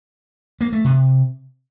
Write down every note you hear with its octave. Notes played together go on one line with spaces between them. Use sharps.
A#3
A3
C3